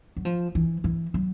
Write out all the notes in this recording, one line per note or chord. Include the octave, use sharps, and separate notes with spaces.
F#3
F3
E3
E3
F#3